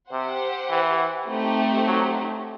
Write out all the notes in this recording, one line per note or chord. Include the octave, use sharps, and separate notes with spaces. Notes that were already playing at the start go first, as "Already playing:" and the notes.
C3 G4 C5 F#5
E3
A3 C4 D#4 G4 C5
F#3